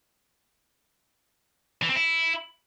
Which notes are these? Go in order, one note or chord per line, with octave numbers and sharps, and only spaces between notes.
E3
C4
E4